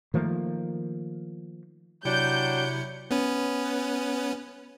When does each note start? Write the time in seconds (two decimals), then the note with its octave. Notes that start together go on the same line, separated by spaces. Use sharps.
0.14 D#3 F3 A3 A#3
2.05 C3 F#3 D4 E4 G5 G6 C#7
3.11 B3 C#4 B4